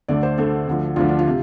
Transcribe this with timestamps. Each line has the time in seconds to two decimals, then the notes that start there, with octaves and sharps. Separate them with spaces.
0.08 D2 D3 A3 D5
0.23 C5
0.38 D2 D3 A3 A4
0.68 D2 D3 F3
0.96 D2 D3 F3 F4
1.08 D4
1.19 F4
1.27 C3